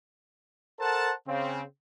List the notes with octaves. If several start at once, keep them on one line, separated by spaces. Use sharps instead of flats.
A4 A#4 C5 F#5 A5
C#3 C4